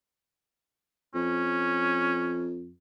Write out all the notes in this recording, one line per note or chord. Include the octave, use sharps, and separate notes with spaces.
F2 C#4